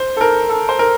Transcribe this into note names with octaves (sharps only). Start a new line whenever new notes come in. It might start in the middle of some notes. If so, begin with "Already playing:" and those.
Already playing: C5
A4
A#4
A4
C5
A#4